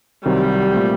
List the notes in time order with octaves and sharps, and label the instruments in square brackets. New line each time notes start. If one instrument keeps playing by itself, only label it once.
[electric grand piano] C2 C3 D#3 F#3 C4 [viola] G3
[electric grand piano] A#2 A3 C4 G4